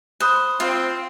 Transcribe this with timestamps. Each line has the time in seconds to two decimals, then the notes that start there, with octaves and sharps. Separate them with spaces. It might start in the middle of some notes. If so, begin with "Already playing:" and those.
0.20 C5 B5 D#6 F#6
0.60 C4 F4